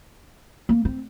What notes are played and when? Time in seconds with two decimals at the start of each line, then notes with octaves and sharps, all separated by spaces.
0.69 A#3
0.85 C4